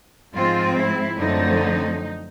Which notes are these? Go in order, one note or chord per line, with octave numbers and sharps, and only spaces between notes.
G#2 F3 G#3 C4 F4
E4
F#2 D3 F3 A3 C4 D#4